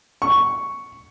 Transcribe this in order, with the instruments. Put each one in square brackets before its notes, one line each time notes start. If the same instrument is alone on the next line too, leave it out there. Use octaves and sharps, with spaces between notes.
[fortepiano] C#6